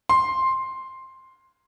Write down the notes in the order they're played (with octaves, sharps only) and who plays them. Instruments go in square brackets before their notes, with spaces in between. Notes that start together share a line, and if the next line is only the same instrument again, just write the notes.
[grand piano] C6